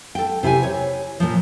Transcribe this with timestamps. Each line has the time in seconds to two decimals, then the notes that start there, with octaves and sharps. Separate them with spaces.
0.15 A4 G5
0.43 C3 E4 G4 G#5
0.63 C#5
1.20 A#2 F3